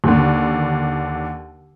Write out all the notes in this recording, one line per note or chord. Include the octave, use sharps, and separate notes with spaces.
D#2 D3